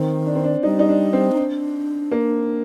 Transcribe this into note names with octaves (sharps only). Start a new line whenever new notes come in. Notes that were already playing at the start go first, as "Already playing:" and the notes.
Already playing: D#3 C4
D4
C4
D4
G3 D#4
D#4
D4
C4
D#4
D4
A#3